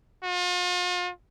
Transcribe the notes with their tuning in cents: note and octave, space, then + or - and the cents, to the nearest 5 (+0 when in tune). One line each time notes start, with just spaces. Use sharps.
F4 +45